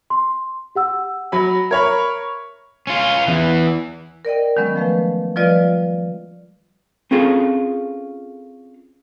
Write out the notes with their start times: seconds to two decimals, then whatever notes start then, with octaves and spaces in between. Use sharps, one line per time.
0.10 C6
0.75 G4 F#5 E6
1.32 F#3 B5
1.71 A#4 C#5 E5 B5 G#6
2.87 C#4 F4
3.27 E2 E3
4.25 A#4 D5 D#5 G5
4.57 D#3 F#3 G#3 B3 C#4
4.76 F3 A3 B4
5.36 F3 G3 F4 B4 D5 D#5
7.11 C4 C#4 F4 G#4 A4